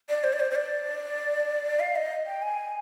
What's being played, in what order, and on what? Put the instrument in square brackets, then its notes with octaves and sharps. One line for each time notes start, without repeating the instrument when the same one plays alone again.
[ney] D5
C5
D5
C5
C5
D5
F5
D#5
G5
G#5